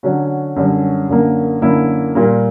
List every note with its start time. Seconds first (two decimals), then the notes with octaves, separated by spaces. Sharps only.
0.03 D3 F#3 C#4 F#4
0.56 F#2 D3 G3 C#4
1.09 F#2 D3 A#3
1.62 F#2 D3 A#3 E4
2.15 A#2 G3 A#3